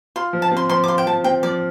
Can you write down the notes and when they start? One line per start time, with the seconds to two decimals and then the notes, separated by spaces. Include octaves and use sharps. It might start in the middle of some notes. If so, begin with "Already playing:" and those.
0.16 F4 C6
0.33 F3
0.42 A5
0.51 C4
0.57 C6
0.69 F3 C6
0.84 D6
0.88 F4 C6
0.98 G5
1.07 F3 A5
1.24 C4 G5
1.43 F3 D5